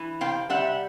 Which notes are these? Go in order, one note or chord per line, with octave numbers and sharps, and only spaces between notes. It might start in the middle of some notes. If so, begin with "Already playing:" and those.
Already playing: E3
C3 F5 G5
G3 E5 F#5